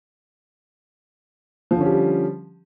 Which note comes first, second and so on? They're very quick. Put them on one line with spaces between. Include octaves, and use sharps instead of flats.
F3 D3 C#4 G4 G3